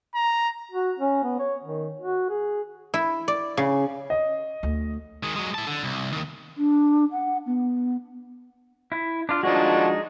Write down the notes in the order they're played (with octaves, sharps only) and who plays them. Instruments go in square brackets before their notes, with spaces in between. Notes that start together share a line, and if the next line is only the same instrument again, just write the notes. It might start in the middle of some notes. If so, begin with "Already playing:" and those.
[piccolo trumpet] A#5
[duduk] F#4
C#4
B3
C#5
D#3
F#4
G#4
[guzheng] E4
D5
C#3
[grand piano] D#5
[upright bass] D2
[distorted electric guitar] D#3 G#3
F#3 G#3
E4 A5
D3
C2
D#3 A#3
[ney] D4
F#5
B3
[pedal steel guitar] E4
D4 F4
[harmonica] F3 D4 F#4 [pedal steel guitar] G#3 D#4